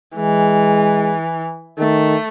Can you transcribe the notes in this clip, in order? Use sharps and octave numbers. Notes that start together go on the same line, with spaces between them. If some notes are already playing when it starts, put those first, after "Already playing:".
E3 G#3
D#3 A3